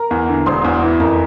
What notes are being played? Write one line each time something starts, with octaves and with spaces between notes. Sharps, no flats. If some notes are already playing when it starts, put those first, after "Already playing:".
Already playing: A#4 A#5
E2
D3
E1 C5 C6
E2
E3
F2 A#4 A#5